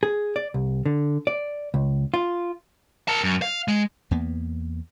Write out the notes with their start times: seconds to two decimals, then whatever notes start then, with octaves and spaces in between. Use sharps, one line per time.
0.03 G#4
0.36 D5
0.54 C2
0.86 D3
1.27 D5
1.74 C#2
2.14 F4
3.08 A#4 A5
3.24 F#2
3.42 F5
3.68 G#3
4.11 E2 A#3 B3